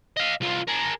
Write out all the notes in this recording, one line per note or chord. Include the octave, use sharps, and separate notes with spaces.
D#5 F5
C2 F4
G#4 A#4